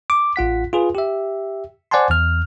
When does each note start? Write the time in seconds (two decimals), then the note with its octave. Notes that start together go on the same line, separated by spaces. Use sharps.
0.10 D6
0.36 A1 F4 F#5 B6
0.73 F4 G#4 B4
0.95 G4 E5
1.91 C5 D5 F#5 G#5 A5 C6
2.10 E2 F6